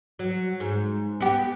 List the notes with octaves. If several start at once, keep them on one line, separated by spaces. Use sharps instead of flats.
F#3
G#2
B3 G4